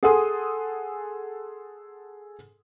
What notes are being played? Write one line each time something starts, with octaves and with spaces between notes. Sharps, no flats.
G#4 A4 F#5 G#5 C6 D#6